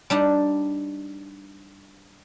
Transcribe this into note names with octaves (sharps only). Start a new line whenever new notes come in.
G3 D4 D#4